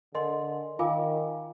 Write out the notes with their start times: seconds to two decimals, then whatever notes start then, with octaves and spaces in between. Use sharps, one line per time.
0.14 D3 A#4 D#5 G#5 C6
0.79 D#3 F4 A#4 F5 G#5 D6